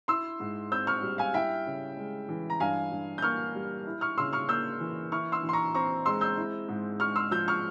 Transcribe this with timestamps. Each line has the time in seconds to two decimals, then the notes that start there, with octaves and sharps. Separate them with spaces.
0.08 E4 C6 E6
0.40 G#2
0.71 C4 E6 G6
0.87 C#6 F6
1.03 G3
1.18 F5 G#5
1.34 E4 E5 G5
1.66 C#3
1.97 G#3
2.29 E3
2.50 A#5
2.60 G2 F5 G#5
2.91 G2
3.18 G6
3.22 A#3 C#6 F6
3.55 G3
3.86 E4
4.01 C#6 F6
4.17 C#3 C6 E6
4.33 C#6 F6
4.49 A#3 E6 G6
4.80 E3
5.12 E4 C#6 F6
5.32 C6 E6
5.43 E3
5.49 C6
5.53 A#5 C#6
5.75 C4 A#5 C#6
6.06 G#3 C6 E6
6.21 E6 G6
6.38 E4
6.68 G#2
7.00 G#3 C#6 F6
7.16 C6 E6
7.31 F3 E6 G6
7.48 C#6 F6